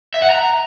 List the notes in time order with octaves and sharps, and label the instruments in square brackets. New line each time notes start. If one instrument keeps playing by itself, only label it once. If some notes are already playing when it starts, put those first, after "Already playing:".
[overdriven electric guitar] E5
F#5
A#5